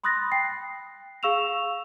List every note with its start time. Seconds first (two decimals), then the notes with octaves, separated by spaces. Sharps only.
0.04 B5 C6 D#6 F#6 A6 A#6
0.32 G5 C7
1.23 G#4 F5 C#6 E6 E7 F7